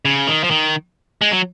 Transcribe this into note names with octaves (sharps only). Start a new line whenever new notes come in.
C#3
D#3
F3
D#3
G#3
F#3